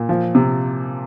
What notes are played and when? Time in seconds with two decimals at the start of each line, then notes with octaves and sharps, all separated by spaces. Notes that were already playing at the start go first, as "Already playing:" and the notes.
Already playing: A#2
0.09 F3
0.35 C3